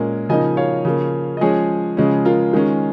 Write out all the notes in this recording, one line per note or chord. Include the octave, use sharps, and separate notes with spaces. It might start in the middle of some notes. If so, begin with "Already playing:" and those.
Already playing: A#2 G#3 C#4 A#4
C#3 F3 A#3 D#4 D#5 G#5
C#5 F5
C#3 F3 A#3
D#5
F3 G#3 C#4 G#4 C#5
C#3 F3 G#3 C#4
F4 A#4
D#3 G#3 C#4